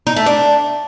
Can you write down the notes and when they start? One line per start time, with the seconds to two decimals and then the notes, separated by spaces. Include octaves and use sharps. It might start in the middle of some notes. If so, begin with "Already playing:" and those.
0.07 D#4
0.16 A3
0.26 D4